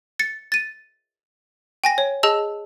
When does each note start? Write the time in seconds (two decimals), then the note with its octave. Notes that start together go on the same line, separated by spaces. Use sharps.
0.19 A6 C#7
0.52 A6 D#7
1.84 G5 G#5 A#6
1.98 C#5
2.23 G#4 D#5 A5 E6